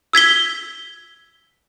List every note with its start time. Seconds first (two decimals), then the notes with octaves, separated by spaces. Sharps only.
0.13 E6 G#6 B6 G7